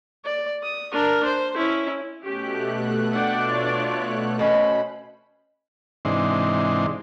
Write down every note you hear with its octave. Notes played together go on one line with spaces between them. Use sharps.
D5
D#6
D4 A#4
C5
C#4 E4
B2 A3 C#4 G4 F#6
D4 D5 F#5 G5
F4 C#5
B2 C#4 C5 B5
G#2 C3 E3 D4 D#4 C6